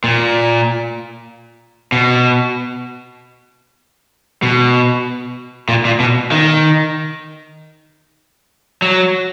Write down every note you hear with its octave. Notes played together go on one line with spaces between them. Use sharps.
A#2
B2
B2
A#2
A#2
B2
D#3
F#3